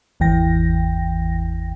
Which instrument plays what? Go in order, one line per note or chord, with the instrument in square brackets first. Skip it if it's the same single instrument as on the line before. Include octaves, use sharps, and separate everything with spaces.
[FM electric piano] G#1 E2 E3 G5 A#6